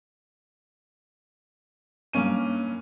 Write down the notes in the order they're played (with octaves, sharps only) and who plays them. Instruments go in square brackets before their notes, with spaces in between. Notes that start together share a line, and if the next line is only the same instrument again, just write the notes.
[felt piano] G2 A#3 C#4 D#7